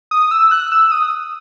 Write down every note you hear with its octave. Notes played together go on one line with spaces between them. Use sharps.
D#6
E6
F#6
E6
D#6